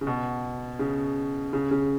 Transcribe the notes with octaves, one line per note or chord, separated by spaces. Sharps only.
C#3
B2
C#3
C#3
C#3